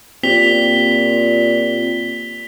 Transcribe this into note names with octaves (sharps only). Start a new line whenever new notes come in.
A#2 C4 G4 B6 F7 G7